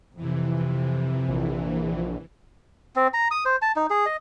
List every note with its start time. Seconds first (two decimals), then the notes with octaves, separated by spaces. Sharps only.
0.16 F2 C3 E3
1.28 A#1
2.96 C4
3.14 A#5
3.31 D#6
3.45 C5
3.62 A5
3.76 D#4
3.90 G#4
4.06 D#5